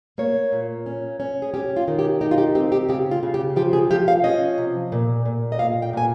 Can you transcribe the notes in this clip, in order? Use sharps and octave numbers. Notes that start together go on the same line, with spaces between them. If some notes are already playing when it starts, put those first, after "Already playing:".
A#3 C#5
A#2
C#4
C#4
G#4
C#4 G4
F4
D#3
G4
D#4 G4
F4
G4
C4 G4
G4
C#3 G4
F4
C#3
G4
F3 G4
G#4
F3 G4
F5
C#4 D#5
C3
A#2
A#2
D#5
A#2 F5
G5
A#2 G#5